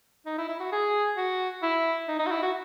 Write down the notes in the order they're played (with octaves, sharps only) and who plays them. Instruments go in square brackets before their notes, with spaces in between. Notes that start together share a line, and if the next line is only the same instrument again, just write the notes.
[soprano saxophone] D#4
E4
E4
F#4
G#4
F#4
E4
D#4
D#4
F#4
E4
F#4